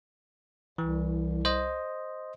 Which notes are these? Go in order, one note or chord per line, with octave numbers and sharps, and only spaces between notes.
C2 E3
C5 D#5